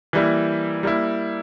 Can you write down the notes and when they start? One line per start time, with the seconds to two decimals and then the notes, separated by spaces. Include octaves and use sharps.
0.13 E3 G3 A#3 E4
0.83 G3 A#3 E4